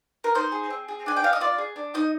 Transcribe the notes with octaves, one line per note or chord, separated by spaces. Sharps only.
A#4
D#4 C5
G#4
C4
G#4
D4 G#5
G5
D4 F5
D#5
F4 D5
G#4
D4
D#4 D#5